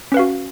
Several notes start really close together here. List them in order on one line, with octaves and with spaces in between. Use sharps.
C#4 B4 F5 F#4